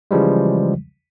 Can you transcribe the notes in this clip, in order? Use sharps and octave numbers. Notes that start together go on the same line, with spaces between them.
C#3 E3 F3 G3 G#3